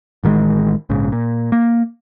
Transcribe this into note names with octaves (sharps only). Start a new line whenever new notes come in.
A1 D#3 E3 G#3
A#1 G#2 C#3
A#2
A#3